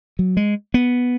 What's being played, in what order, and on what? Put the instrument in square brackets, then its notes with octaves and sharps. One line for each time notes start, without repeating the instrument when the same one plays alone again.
[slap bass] F#3
G#3
B3